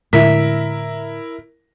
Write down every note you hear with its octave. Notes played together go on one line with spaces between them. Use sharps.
A2 D3 G#3 E4 A#4 E5